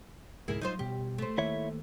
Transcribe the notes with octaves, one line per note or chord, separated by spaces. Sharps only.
C#2 G#2 B2 E4 G#4 A#4
F#3 G3 D#4 F4 C5
B2 G3 G4
A3 C5
D#3 A#3 E4 C#5 E5